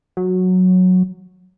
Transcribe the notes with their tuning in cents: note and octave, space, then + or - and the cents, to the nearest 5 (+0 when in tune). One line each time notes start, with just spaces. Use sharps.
F#3 -10